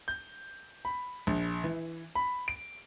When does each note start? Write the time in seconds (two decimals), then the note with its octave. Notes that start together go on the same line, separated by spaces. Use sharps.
0.08 G6
0.85 B5
1.27 A#1
1.64 E3
2.15 B5
2.48 D7